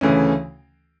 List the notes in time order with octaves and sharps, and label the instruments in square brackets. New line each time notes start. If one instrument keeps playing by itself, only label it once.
[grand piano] D2 C#3 E3 A3 C#4